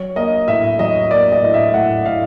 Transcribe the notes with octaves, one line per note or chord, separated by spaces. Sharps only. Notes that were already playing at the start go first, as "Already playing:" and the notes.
Already playing: F#3 C#5
A#3 D#5
A2 E5
F#3 D#5
A#3 D5
D#5
A2
E5
A2 F#5
A2 F5